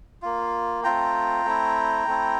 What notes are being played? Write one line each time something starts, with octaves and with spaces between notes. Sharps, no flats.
A#3 F4
A3 C4 F4 G5 A#5
A3 C4 E4
A3 C4 E4